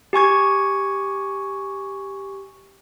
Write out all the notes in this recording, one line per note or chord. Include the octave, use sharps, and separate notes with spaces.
G4 G#5 C#6 G#6